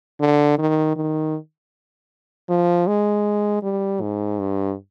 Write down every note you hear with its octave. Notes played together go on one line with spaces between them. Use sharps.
D3
D#3
D#3
F3
G#3
G3
G#2
G2